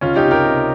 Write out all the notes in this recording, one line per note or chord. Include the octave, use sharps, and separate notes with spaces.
C#2 C#4 F4
D#4 G4
C3
G4 A#4
C3